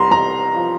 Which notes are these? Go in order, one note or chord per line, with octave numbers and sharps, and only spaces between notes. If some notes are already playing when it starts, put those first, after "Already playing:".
Already playing: C2 A#5 C6
C2 A#5
F3